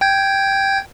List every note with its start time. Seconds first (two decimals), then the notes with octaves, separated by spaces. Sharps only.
0.01 G5 G6 G#6